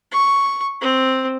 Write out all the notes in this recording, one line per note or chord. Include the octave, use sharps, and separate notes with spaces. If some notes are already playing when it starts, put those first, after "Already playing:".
C#6
C4